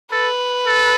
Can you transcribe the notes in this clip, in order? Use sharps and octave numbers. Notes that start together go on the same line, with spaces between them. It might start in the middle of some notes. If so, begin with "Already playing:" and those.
A4 B4
A4